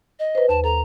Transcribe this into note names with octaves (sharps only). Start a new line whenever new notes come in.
D#5
B4 C5
D#2 A5
A4 A#5